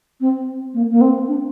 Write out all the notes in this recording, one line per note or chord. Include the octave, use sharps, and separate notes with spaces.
C4
A#3
A#3
C4
D4